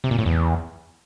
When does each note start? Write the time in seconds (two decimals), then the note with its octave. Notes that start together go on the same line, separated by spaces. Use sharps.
0.04 C3
0.11 A#2
0.18 A2
0.26 E2